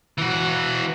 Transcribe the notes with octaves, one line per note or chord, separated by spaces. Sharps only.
E3 F#4